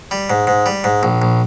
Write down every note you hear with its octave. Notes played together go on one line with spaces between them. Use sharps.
G3
G#2
G#2
G3
G#2
A#1
A#1